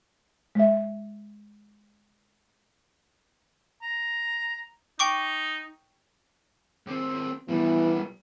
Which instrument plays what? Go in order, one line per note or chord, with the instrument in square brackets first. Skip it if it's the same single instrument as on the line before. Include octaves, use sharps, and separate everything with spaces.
[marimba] G#3 E5
[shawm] A#5
[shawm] D#4 [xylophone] G5 C#6 D6
[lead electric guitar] D#2 C4
[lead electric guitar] B2 G3 [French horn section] E3 B3